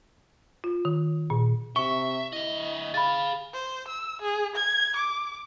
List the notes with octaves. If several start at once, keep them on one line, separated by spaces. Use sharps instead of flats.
F4
D#3
A#2
C3 E5 C#6 G7
D3 E4 D#5
G#4 F5 B5 A6
C5
E6
G#4
G#6
D6